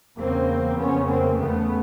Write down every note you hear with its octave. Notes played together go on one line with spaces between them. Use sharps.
E2 C#3 A#3 C4
F2 C#3 B3 C#4
A#3 C4
E2 C#3 A3 B3